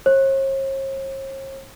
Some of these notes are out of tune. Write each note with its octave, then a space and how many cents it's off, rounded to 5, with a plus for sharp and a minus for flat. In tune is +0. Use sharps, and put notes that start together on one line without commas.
C#5 -45